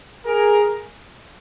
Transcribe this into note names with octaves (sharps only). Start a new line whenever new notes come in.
G#4 A#4